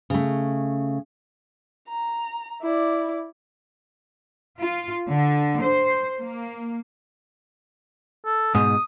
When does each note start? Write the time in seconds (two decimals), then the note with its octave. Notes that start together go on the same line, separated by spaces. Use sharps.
0.10 C#3 A3
1.89 A#5
2.61 E4 D5
4.59 F4
5.10 D3
5.64 C5
6.19 A#3
8.26 A4
8.55 G#2 B2 D#6